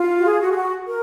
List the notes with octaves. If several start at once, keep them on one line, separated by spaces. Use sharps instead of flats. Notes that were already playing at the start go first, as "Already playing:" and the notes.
Already playing: F4
F#4
G#4
F#4
G#4
F#4
A#4